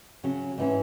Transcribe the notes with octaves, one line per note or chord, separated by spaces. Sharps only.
C#3 F#3 C#4
G#2 E3 C#4